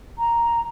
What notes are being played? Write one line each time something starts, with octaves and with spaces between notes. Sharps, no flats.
A#5